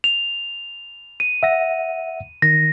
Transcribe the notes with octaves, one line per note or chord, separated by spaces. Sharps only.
F7
D#7
E5 F#5 A#6
D#3 A#6